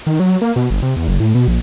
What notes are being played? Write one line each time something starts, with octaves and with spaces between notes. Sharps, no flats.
D#3
F#3
A#3
B2
G1
C3
E2
F#1
A2
B2
A#1